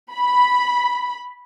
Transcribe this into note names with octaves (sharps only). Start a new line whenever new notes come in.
B5